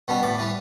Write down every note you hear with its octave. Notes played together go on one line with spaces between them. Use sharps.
B2 G3 B3 D4
A2 D5
E3 G3